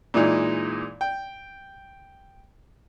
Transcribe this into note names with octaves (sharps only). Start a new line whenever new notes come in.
A#2 E3 G#3 D#4
G5